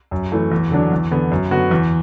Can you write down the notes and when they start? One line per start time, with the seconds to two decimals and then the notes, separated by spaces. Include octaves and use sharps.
0.11 F#2
0.32 E3 A3
0.52 E2
0.71 D3 F#3 D4
0.92 E2
1.11 D3 B3
1.31 F#2
1.51 D3 B3 F#4
1.71 E2